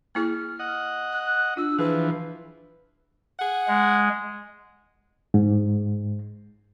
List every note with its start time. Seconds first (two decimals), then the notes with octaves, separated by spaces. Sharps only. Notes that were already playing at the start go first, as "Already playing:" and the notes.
0.15 A#3 E4 G#4 F6
0.59 D#5 F#5
1.12 F#6
1.57 D4 F4 E6
1.79 E3 F3 G#4 B4
3.39 G#4 F#5
3.68 G#3
5.34 G#2